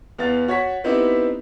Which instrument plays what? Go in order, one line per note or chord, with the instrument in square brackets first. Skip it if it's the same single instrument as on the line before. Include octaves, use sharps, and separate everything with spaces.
[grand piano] E2 B3 F5 A6
F#4 C#5 F#5 B6
B3 C4 D#4 E4 G4 B4